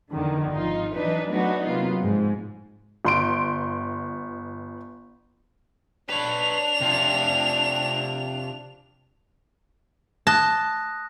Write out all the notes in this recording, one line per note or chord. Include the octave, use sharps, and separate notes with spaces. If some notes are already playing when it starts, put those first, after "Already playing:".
E2 D3 D#3 F3
G#1 F3 D#4 F4
E3 F#3 D4 D#4 B4
F#3 A3 B3 D4 D#4 F#4
C3 F#3 A#3 B3 F4
G#2 F3 G#3
G1 C6 D7
D4 B4 C#5 F7
C3 F4
A5 D#6 F#6 A#6